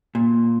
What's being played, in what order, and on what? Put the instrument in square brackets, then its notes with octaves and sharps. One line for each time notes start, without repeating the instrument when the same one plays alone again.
[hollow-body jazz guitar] A#2